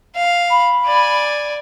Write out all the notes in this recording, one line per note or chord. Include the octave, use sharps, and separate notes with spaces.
F5
B5
D5 G#5